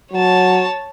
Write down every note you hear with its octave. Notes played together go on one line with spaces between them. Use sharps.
F#3 C#5 A5